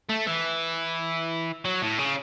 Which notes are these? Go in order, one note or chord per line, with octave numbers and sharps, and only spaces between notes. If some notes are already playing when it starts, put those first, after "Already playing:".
A3
E3
F#3
A2
C#3